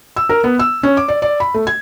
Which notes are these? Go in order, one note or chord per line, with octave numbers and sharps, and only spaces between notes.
E6
A#4
B3
E6
C#4
D6
D5
D5
B5
A3
G#6